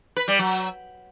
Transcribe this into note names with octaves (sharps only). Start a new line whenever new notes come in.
B4
G3
F#3